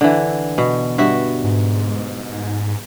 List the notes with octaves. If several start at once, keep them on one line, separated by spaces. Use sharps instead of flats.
D3 E3
B2
G2 F#4 E5
G#2